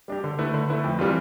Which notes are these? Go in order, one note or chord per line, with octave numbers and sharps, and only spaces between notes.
G3 D4 G4
D3
A3 E4 B4
D3
A3 E4 B4
F2
E3 G3 C4 F4